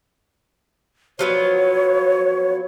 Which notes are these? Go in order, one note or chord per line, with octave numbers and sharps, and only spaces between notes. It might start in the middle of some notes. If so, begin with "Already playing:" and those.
F3 F#3 B3 C#5